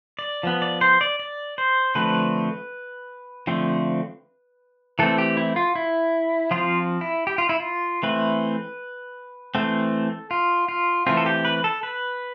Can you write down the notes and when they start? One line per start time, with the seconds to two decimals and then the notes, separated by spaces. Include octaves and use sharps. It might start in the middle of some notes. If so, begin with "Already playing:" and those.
0.19 D5
0.43 F3 B3
0.62 D5
0.81 C5
1.01 D5
1.19 D5
1.58 C5
1.95 D3 F3 A3 C4 B4
3.47 D3 F3 A3 C4
4.99 E3 A3 C4 A4
5.18 G4
5.37 E4
5.56 F4
5.75 E4
6.51 F3 C4 F4
7.01 E4
7.27 G4
7.38 F4
7.49 E4
7.60 F4
8.03 E3 A3 C4 B4
9.55 E3 A3 C4 A4
10.31 F4
10.69 F4
11.07 E3 A3 C4 F4
11.17 A4
11.26 G4
11.45 B4
11.64 A4
11.83 B4